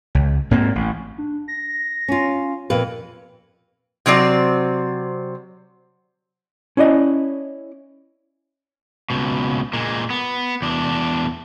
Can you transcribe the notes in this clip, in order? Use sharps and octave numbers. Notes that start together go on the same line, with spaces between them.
C#2
G#2 A#3 C4
A1
D4
A#6
C#4 F4
F2 A#2 A#3 B4
C3 F#3 C4 D5
C#4 E4 D5 D#5
C#2 B2
A#2 G#3
B3
E2 D4